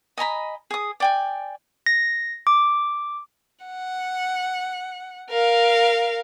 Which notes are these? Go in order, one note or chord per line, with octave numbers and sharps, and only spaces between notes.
D#5 G#5 A#5 B5
G#4 D#6
D5 G5 G#5
A#6
D6
F#5
A#4 F5